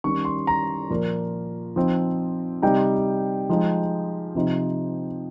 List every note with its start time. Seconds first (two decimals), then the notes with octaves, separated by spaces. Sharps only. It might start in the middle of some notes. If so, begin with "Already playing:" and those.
0.04 D#3 G3 C#4 C#6
0.25 C6
0.47 A#5
0.90 A#2 F3 A#3
1.76 F3 C4 D#4
2.62 C3 G3 C4 D#4 G5
3.50 F3 G#3 D#4
4.35 C3 F3 C4 D#4